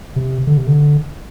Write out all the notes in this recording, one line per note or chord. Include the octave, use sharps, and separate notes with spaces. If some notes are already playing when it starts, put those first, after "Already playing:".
C3
D3
C3
D3